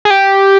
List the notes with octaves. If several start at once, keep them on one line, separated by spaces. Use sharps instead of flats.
G#4
G4